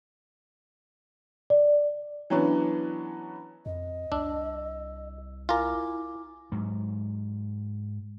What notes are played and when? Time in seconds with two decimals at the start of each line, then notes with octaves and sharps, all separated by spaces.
1.50 D5
2.30 E3 F#3 B3 C#4 D4
3.66 F2 D#5
4.12 C2 D4 E6
5.49 E4 F4 A#4 G#5 D6
6.52 G#2 F#3